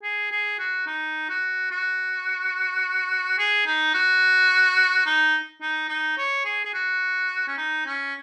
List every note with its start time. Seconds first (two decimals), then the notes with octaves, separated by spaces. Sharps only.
0.03 G#4
0.32 G#4
0.59 F#4
0.87 D#4
1.29 F#4
1.71 F#4
3.39 G#4
3.66 D#4
3.94 F#4
5.06 D#4
5.62 D#4
5.89 D#4
6.18 C#5
6.45 G#4
6.65 G#4
6.74 F#4
7.48 C#4
7.58 D#4
7.86 C#4